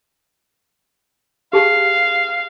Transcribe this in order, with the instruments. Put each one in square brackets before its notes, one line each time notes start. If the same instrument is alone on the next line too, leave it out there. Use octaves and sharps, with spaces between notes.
[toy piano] G4 G#4 A5 [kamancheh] F5